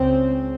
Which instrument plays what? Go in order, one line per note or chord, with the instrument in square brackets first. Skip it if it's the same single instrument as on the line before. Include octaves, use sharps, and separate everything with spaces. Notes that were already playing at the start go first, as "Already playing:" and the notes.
Already playing: [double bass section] C#2 C#3 C4